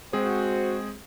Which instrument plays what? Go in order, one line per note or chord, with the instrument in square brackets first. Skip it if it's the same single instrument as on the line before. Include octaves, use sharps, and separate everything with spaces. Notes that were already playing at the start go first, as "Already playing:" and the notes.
[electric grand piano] G#3 C4 G#4 [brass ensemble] F#4 [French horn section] C5